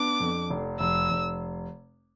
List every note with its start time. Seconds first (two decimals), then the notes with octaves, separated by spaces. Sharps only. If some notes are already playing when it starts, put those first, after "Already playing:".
Already playing: B3 D4 D6
0.20 F2
0.50 F1
0.80 F1 E6
1.11 F1